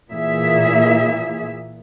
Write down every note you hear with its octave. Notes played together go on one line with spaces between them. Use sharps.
A#2 E3 G#4 E5